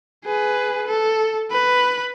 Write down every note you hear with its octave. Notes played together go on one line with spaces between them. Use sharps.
G#4 B4
A4
B4 B5